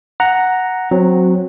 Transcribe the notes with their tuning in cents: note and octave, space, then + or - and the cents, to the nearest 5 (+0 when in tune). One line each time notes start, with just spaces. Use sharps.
F#5 +0 A#5 +0
F#3 -15 C4 +0